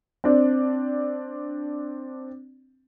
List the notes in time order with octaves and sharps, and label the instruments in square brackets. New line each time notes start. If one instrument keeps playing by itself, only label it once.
[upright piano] C4 D4